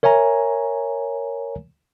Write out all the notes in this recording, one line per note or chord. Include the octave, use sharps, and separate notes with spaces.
A#4 C#5 E5 G#5 A#5